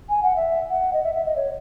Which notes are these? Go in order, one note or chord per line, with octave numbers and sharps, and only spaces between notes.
G#5
F#5
E5
F#5
D#5
E5
E5
D#5
C#5